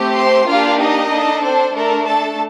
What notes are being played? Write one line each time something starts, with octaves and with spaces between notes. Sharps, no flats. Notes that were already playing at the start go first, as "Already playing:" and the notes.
Already playing: A3 C4 G4
C5 C6
A#3 D4 F4 G4 F5
D#4 D#5
D4 A4
C4 C5
A3 D4 A4 A#4
A4 A5